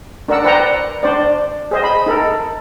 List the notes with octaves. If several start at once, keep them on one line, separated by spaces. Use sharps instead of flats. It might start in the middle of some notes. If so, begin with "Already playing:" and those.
D4 A#4 D5 F#5 E6
B4 C5 D5 F#5 G5 A#5
D4 C5 D5
G#4 C5 D#5
B5
D#4 A4 A#4